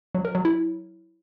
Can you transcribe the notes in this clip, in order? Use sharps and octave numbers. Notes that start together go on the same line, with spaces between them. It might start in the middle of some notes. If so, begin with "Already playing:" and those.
F#3
A#4
F#3
E4